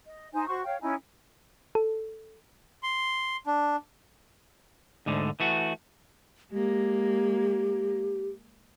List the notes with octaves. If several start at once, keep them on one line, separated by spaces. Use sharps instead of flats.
D#5
D#4 C5 G#5
F#4 C5 C#6
C#5 F5 G5
C#4 D#4 E4 G#5
A4
C6
D4
D2 G#2 D3
E3 A3 F#4
G#3 A#3 G4